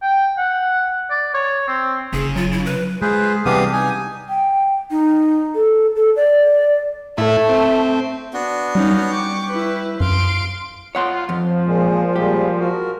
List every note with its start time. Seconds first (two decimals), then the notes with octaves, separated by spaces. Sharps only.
0.02 G5
0.38 F#5
1.10 D5
1.34 C#5
1.68 C4
2.13 F#1 C#3 G#4
2.36 F#3 F4
2.52 E4
2.66 B4
3.02 G#3 F4 G#4 B4 C5
3.45 C3 E3 G3 B3 D4 G4 F5 D#6
3.73 D#4 G#5 D#6
4.29 G5
4.91 D#4
5.55 A4
5.96 A4
6.16 D5
7.18 A2 A3 E4
7.49 C4
8.34 B3 D4 F#4
8.75 G3 C#4 D#4
9.12 G5 C#6 D6
9.50 E4 B4
10.00 F#2 F5 C6 D7
10.95 F4 C#5 F#5 C6
11.29 F2 F3
11.66 A#2 G#3
12.16 A#2 G3 G#3 G4
12.60 F#4 A#4